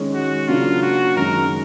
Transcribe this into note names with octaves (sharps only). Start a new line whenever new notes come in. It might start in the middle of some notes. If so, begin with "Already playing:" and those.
Already playing: D#3 G#3 C#4
F#4
C#3 F#3 A#3 D4 F4
F#4
F#2 D#3 G#3 A#4